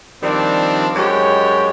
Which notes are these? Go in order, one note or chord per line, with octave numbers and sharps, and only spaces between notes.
D#3 F3 G3 C4 D4
F#2 G#3 G4 C#5